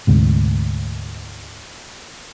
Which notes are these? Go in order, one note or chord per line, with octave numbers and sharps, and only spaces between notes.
D2 G#2 C3